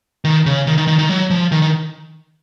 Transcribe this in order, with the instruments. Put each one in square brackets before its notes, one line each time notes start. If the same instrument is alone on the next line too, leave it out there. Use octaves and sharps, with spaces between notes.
[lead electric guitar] D#3
C#3
D#3
D#3
D#3
D#3
F#3
F3
D#3
D#3